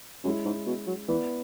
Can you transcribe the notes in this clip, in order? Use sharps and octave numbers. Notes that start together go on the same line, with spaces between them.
F#2 G#3 C#4 E4 G#4
G#2
B2
F#3
E3 B3 E4 B4 D5